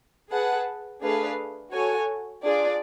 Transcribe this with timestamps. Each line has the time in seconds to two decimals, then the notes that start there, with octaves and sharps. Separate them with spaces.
0.31 G#4 B4 F#5 A5
1.01 A3 D4 G#4 B4 F5
1.72 F#4 A4 C#5 G#5
2.43 D4 F4 G#4 D5